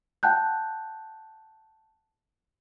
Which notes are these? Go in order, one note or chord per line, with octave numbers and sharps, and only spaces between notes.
F#5 G5 A5 F#6 G6